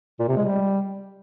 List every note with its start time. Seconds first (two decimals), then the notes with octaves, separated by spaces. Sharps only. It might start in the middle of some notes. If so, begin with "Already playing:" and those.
0.19 A#2
0.28 C3
0.37 G#3
0.45 G3